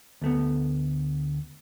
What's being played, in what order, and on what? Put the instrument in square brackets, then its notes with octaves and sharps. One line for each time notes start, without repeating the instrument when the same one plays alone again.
[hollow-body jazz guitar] D2 A3 B3